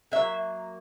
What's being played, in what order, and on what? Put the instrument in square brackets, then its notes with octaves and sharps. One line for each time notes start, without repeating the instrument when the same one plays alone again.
[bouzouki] D3 F#3 A#3 E5